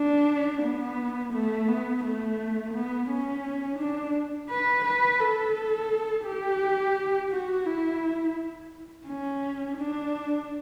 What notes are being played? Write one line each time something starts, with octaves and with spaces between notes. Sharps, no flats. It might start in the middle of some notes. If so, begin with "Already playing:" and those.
Already playing: D4
B3
A3
B3
A3
B3
C#4
D4
B4
B4
A4
G4
F#4
E4
C#4
D4